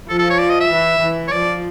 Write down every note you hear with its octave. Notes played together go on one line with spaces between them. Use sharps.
F3 A4
A4
C#5
D5
D#5
E5
E3
E3
C#5
F3 D5